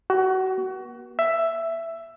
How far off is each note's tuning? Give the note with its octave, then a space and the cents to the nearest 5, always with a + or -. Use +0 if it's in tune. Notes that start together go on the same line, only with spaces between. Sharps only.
F#4 +25
B3 -45
E5 +10